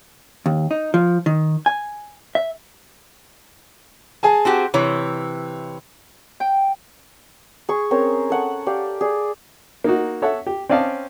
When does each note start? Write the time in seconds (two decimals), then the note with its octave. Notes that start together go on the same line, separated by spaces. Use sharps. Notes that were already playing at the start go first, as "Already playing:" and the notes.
0.46 D#2
0.71 D#4
0.94 F3
1.26 D#3
1.66 G#5
2.35 E5
4.23 G#4 G#5 A5
4.45 C4 F#4 G4
4.74 C3 E3 C#5
6.40 G5
7.69 G#4 C#6
7.91 C4 C#4 A#4 C#5
8.30 A4 F#5 C#6
8.66 G4 D5 F5
9.01 G#4 D5
9.84 A#3 D#4 F#4
10.22 A4 C#5 E5 F#5
10.46 G4
10.69 C4 C#4 D5 D#5 F5 A5